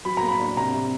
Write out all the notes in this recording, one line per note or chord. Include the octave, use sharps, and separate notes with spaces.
F#3 B5
A#5
A#3
B5
D4
C3 A#5
C3